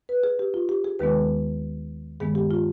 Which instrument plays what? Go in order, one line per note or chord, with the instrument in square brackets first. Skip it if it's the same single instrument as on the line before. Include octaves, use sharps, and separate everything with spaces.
[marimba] B4
G#4
G4
F4
G4
G#4
D#2 D#3 G#3 B3 B4
G2 D#3 G#3 B3 G#4
G4
F4